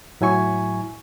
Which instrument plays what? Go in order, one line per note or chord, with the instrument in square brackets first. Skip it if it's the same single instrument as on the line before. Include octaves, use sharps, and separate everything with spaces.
[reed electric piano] A2 F#3 E4 G#5 C#6